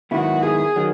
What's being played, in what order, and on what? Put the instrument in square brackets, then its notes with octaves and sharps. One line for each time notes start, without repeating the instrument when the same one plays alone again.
[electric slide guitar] G#2 D#3 F#3 B3 E4 [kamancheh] F#4
[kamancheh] G#4
[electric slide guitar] D#3 F#3